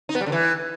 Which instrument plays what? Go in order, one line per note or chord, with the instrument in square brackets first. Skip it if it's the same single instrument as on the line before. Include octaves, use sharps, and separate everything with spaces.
[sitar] D#4
B3
G3
D3
E3